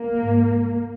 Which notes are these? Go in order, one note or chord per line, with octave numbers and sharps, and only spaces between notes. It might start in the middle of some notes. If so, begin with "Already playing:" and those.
Already playing: A#3
G#2